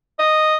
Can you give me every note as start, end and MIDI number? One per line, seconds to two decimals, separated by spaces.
0.19 0.56 75